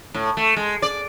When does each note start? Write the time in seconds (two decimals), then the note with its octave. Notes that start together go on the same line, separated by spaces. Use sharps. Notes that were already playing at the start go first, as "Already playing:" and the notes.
0.14 A2
0.37 A3
0.56 G#3
0.82 D5